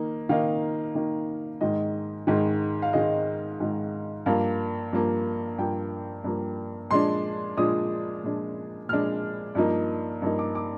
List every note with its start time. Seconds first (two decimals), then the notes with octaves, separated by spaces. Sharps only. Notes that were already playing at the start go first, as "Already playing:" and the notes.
Already playing: D#3 A#3 D#4
0.29 D#3 A#3 D#4 F5
0.94 D#3 A#3 D#4
1.61 G#2 D#3 G#3 D#5
2.27 G#2 D#3 G#3
2.82 F5
2.93 G#2 D#3 G#3 D#5
3.60 G#2 D#3 G#3
4.26 G2 F3 A#3 F5
4.93 G2 F3 A#3
5.58 G2 F3 A#3 G5
6.24 G2 F3 A#3
6.91 A#2 F3 G#3 D4 C6
7.57 A#2 F3 G#3 D4 D#6
8.23 A#2 F3 G#3 D4
8.89 A#2 F3 G#3 D4 F6
9.55 G2 F3 A#3 D#4
10.22 G2 F3 A#3 D#4
10.39 D6
10.55 D6